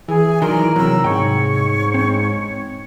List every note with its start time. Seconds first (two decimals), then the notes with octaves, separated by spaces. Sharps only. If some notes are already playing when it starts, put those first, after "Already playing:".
0.08 E3 G#4 G#5
0.42 D#3 F#3 A#4 D5 G#5 C6
0.76 E2 C3 F#3 A#5 B5 E6
1.04 C2 G#2 C#5 G5
1.94 C4